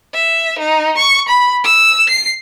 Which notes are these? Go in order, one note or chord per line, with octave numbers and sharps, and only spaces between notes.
E5
D#4
C#6
B5
E6
C7